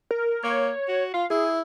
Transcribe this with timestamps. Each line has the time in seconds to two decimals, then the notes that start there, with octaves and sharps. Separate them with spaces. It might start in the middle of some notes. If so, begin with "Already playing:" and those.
0.11 A#4
0.43 A#3 C#5
0.88 F#4
1.14 F4 F5
1.30 E4 G#4